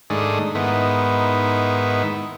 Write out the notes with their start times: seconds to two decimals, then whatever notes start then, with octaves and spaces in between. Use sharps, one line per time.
0.10 G#2 D#3 A3 D4 G#4
0.55 G#2 D#3 B3 E4